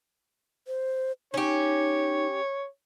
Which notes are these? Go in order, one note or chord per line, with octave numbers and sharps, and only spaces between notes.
C5
C#4 D#4 G4 C#5